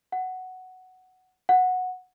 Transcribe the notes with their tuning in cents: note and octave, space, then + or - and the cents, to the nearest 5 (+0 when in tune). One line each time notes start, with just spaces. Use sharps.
F#5 +5
F#5 -10